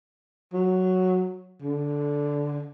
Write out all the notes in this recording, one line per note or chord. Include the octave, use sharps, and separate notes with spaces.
F#3
D3